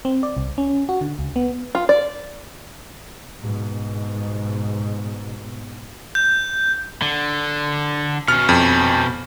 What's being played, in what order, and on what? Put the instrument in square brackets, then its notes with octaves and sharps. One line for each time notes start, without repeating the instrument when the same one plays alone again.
[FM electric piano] C4
D5
C2
C#4
F#4
D3
C#2
B3
[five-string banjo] F4
D5
[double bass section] G#2 B2
[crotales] G6
[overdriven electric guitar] D3
[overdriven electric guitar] B2 C#4 [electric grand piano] F6
[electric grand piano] F2